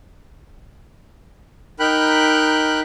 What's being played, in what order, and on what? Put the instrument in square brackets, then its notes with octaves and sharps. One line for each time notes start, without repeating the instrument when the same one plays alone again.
[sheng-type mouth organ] D#4 A#4 G5 B5 F#6